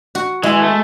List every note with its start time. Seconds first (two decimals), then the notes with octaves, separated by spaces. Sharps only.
0.15 F#4
0.43 E3 G#3
0.61 A3